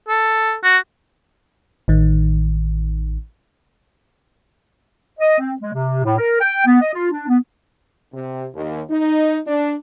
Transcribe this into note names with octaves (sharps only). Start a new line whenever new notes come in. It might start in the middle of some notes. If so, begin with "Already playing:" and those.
A4
F#4
A1 D#3
D#5
C4
G#3
C3
A2
A#4
G5
B3
D#5
F4
D4
B3
C3
D#2
D#4
D4